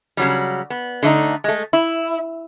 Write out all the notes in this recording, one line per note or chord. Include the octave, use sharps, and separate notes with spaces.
C#3 F#3 G3
B3
D3 A3 D#4
G#3 A3
E4